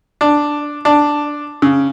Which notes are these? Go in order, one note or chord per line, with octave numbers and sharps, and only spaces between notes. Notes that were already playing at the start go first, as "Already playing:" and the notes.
D4
D4
C#3